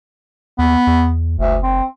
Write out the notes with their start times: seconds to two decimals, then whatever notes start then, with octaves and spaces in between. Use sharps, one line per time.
0.58 D#2 B3
0.87 E2
1.38 F#1 D2
1.63 C4